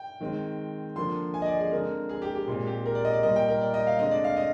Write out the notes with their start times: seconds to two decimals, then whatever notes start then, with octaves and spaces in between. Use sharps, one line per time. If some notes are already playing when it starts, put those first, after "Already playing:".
Already playing: G5
0.21 D#3 G#3 C4
0.96 D3 F3 A#3 C6
1.34 G#5
1.42 D#5
1.46 D5
1.59 G#4
1.72 D3 G#3 C4 A#4
2.09 G#4
2.22 G4
2.35 G4
2.48 A#2 G#3 C4
2.67 G4
2.86 A#4
2.95 D5
3.05 D#5
3.13 D5
3.23 A#2 G3 A#3 D#5
3.36 G5
3.49 A#4
3.61 D5
3.74 D#5
3.87 F5
3.99 D3 G#3 C4 D#5
4.11 D5
4.24 F5
4.36 D#5